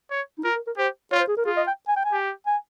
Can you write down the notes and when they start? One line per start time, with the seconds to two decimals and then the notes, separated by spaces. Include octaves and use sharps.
0.11 C#5
0.39 D#4
0.44 F4 A#4
0.56 A#4
0.67 A#4
0.77 G4 C5
1.12 F4 C#5
1.20 C5
1.28 G#4
1.37 A#4
1.46 F4 G#4
1.57 D#5
1.67 G5
1.88 G#5
1.96 G5
2.05 G#5
2.12 G4
2.47 G#5